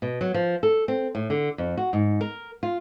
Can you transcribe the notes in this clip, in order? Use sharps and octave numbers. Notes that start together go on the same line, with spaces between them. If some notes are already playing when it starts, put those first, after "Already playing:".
B2
F#3
F3
A4
C4
A2
D3
F2
F#4
G#2
A#4
F4